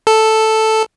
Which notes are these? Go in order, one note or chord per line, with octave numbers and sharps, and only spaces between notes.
A4